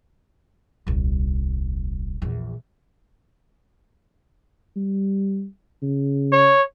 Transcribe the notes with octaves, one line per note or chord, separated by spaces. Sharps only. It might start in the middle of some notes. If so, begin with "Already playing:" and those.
D#1 C2
A#1 E2
G3
C#3
C#5